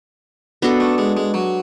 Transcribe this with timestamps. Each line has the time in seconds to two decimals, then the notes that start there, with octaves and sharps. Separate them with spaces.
0.62 B3 D4 F#4 A4
0.80 A3
0.98 G#3
1.17 G#3
1.34 F#3